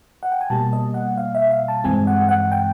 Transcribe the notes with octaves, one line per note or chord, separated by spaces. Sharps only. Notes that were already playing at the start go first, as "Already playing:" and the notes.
F#5
G5
G#5
B2 G3 A#3 A5
D#5
F#5
F5
E5
F5
A5
G2 E3 G#3 C4 G#5
F#5
F#5
G5